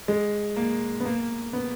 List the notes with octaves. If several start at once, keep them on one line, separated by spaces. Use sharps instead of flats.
G#3
A#3
B3
A#3
B3